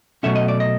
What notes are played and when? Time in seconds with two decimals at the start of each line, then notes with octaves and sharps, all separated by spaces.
0.23 B2 F#3 A3 C#4 E5
0.35 D#5
0.48 D5
0.60 D#5